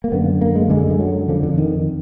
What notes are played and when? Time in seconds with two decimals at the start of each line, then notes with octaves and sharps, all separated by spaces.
0.04 A#3
0.12 F#2 D3 B3
0.41 A#3
0.56 G#3
0.70 F#2 D3 G#3
0.90 G#3
1.00 F#3
1.28 F2 D3 F3
1.43 D3
1.58 D#3